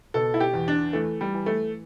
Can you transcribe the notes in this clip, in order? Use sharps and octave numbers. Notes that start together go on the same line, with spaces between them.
B2 A4
E4
G4
E2
D4
E3 A3
G3
E3
A3